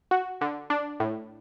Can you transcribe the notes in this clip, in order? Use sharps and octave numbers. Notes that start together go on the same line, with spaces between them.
F#4
D3
D4
A2